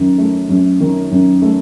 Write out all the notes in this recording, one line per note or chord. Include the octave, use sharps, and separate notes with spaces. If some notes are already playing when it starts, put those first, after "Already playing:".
Already playing: F#2 D#3
A3
F#2
D#3
F#2
A3